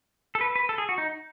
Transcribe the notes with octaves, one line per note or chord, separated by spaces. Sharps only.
A4
B4
B4
A4
G#4
F#4
D#4